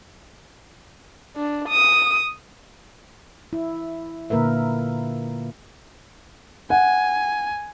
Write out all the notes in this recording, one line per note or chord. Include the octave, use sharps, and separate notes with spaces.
D4
D#6
E4
A#2 D3 A#3 A#4 B4 E5
F#5 G#5